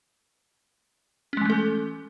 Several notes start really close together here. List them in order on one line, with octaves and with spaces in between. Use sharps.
C#4 G#3 E3 A3 A4